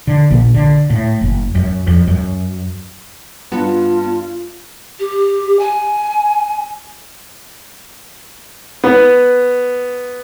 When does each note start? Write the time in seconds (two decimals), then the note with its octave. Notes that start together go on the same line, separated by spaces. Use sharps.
0.07 D3
0.30 A#1
0.54 D3
0.90 A2
1.21 F#1
1.55 F#2
1.87 F2
2.08 F#2
3.52 G2 B3 F4
4.99 G4
5.59 G#5
8.84 B3